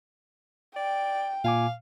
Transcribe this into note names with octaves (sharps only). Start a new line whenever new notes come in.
D5 G5
A#2 F5 G#5 D6